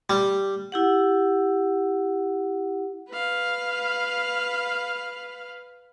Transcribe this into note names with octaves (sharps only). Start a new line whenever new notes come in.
G3
E4 G4 F#5
B4 F5